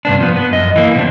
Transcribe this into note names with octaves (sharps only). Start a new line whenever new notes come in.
G2 C3 B3 D4
F3 B3
B3
F#2 D#5
E3 A#3
B2 C4 D4